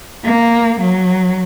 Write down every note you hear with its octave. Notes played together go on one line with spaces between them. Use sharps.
A#3
F#3